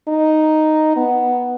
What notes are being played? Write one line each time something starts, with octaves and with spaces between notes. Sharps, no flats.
D#4
B3